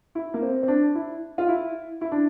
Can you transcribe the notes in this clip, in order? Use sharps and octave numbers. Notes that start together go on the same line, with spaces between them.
E4
A#3
C4
C4
D4
E4
F4
E4
E4
D4